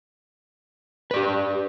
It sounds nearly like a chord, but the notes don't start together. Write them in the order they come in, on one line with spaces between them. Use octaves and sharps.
B4 D5 G4